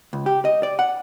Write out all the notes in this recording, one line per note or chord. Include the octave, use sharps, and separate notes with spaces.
C#2
G4
D#5
D5
F#5